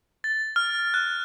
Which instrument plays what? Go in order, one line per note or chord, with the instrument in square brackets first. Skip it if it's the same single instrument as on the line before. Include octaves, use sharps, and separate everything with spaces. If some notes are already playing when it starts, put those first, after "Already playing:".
[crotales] A6
F6
F#6